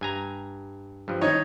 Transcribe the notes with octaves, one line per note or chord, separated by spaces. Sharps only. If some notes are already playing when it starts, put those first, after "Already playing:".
G2 G#5 A#5
G2 F3
D#3 D#4 C#5